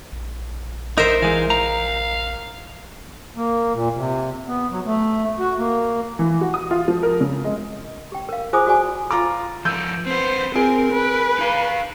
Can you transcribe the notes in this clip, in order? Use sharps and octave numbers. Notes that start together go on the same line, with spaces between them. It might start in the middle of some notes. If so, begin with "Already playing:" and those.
A#1
D#4 A#4 C5 E5
E3 G#3 F5
F5 A#5
A#3
A#2
C3
B3
F#3
A3
F#4
A#3
E3
F#4
D#6
F4
F3
A#4
C#3
G#3
G4 G5
A#4 F5
F4 G#4 C5 G#5 D6 D#6
F#4 G#4 D5 G#5
F4 A#5 D6
F3 D#4 E6 G6
C4 B4 C5
C4 G#4 A#4
B4
D#4 F5